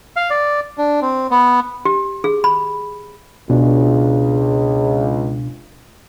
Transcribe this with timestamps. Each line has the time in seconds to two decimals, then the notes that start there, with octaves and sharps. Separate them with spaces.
0.16 F5
0.30 D5
0.78 D4
1.01 C4
1.31 B3
1.85 G4
2.24 G#4
2.44 B5
3.50 C#2 B2 D4